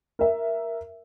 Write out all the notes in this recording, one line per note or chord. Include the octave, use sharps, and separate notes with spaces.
A#4 E5